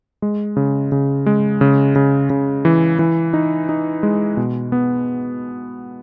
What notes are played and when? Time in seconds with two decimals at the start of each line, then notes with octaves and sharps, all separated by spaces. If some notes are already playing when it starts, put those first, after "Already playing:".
0.22 G#3
0.57 C#3
0.92 C#3
1.26 G#3
1.61 C#3
1.96 C#3
2.30 C#3
2.65 E3
2.99 E3
3.33 D#4
3.69 D#4
4.03 G#3
4.37 B2
4.72 B3